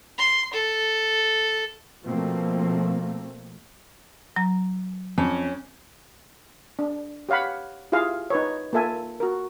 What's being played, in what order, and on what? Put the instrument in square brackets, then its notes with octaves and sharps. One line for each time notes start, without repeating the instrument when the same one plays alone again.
[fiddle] C6
A4
[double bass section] B2 F3 A3 A#3 C4
[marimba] F#3 A#5
[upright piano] F2 [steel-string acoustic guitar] C#4
[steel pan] D4
G4 C#5 F5 F#5 B5
E4 F4 G4 G#4 F5
D#4 B4 C#5
A#3 F4 A4 E5 G#5
F#4 A#4